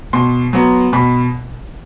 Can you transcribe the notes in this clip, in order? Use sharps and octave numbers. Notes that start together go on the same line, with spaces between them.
B2 C6
F#3 B3
B2 B5